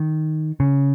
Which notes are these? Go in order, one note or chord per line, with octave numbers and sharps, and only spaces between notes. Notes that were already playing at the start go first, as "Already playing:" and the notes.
Already playing: D#3
C#3